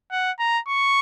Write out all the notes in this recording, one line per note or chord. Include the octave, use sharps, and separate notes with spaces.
F#5
A#5
C#6